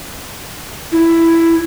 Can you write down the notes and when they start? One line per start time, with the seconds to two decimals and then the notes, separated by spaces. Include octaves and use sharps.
0.92 E4